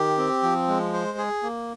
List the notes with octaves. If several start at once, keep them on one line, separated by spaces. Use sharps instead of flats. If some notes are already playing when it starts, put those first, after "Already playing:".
Already playing: D#3 G4
C4
F3
G#3
C5
G#4
A#3